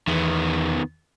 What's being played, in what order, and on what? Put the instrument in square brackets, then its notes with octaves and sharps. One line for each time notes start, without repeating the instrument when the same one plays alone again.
[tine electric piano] E2 [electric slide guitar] D#3 B3